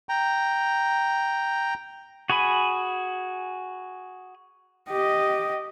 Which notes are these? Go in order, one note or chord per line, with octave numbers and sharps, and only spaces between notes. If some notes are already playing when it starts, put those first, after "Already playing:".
G5 A#5
F#4 G#4 G#5 B5
G4 D#5